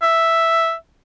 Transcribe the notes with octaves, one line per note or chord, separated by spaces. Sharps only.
E5